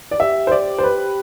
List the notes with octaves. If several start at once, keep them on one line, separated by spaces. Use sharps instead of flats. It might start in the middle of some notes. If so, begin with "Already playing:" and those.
D5
G4 E5
C5
D5
C5
B4